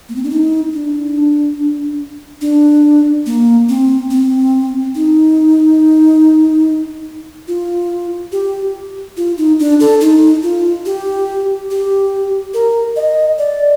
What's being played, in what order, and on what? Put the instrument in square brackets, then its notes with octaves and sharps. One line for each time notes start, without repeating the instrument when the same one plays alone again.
[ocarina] A#3
C4
D4
D#4
D4
D4
A#3
C4
C4
D#4
F4
G4
F4
D#4
D4
A4
D#4
F4
G4
G4
A#4
D#5
D5